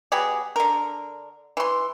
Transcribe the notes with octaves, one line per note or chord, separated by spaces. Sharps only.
F#3 B3 G4 G#4
D3 A#4
E3 C6